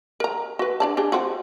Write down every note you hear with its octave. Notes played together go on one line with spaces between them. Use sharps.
A#4 A#5
F#4 B4
D4 D5 A5
D4 G4 G#4
C4 F4 F#4